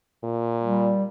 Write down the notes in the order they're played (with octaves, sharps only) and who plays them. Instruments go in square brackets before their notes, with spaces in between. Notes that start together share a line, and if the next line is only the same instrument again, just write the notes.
[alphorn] A#2
[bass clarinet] G3